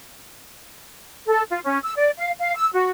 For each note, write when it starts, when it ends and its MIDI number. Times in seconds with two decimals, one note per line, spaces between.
1.27 1.42 69
1.50 1.60 65
1.64 1.78 61
1.83 1.92 88
1.97 2.10 74
2.18 2.31 77
2.39 2.54 77
2.56 2.68 88
2.73 2.90 66